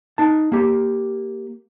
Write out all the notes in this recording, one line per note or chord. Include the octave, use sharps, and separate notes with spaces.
D#4 A5
A#3 G4